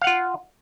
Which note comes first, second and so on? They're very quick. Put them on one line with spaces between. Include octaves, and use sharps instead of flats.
F5 F#5 F4